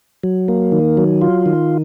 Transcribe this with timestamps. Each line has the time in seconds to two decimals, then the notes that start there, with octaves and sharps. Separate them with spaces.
0.24 F#3
0.48 A#3
0.72 D#3
0.97 F#3
1.22 F4
1.46 D#3